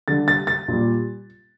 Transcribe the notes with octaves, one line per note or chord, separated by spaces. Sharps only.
D3 G3 A6
A6
A6
A#2 G3